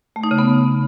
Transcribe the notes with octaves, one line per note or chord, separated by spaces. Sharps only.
A3
D#4
C#3
B3